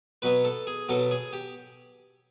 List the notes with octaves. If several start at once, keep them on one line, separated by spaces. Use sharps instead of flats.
B2 F#3 B3 B4
A4
G#4
B2 F#3 B3 A4
G#4
G4